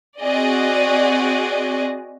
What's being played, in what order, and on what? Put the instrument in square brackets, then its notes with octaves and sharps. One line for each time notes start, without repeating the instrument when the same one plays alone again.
[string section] C4 F#4 G#4 D5 D#5